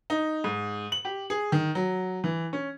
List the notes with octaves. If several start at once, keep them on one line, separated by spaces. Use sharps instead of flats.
D#4
G#2
F#7
G4
G#4
D#3
F#3
E3
C#4